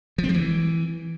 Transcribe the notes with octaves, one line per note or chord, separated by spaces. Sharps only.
F3
C4
G3
E3